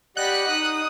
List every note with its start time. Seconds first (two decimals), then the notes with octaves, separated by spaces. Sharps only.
0.17 G4 D5 D#5 F#5 B5 F#6
0.48 D#4 D#6